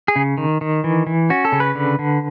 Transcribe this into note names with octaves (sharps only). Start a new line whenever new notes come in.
G#4
C#3
D#3
D#3
E3
E3
C#4 F#4
A4
C#3
B4
D3
D3